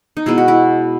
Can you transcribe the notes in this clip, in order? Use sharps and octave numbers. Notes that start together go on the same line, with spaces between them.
D#4
B2 G#3 B3 E4
F#4
E4